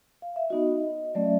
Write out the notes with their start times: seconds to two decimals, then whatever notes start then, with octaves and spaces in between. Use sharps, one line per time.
0.22 F5
0.36 E5
0.50 B3 D#4 F#4 D#5
1.15 F#3 A3 C#4 D5
1.24 E5